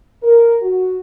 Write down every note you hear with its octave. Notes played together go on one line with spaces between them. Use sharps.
A#4
F#4